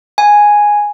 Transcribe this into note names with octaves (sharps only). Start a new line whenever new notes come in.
G#5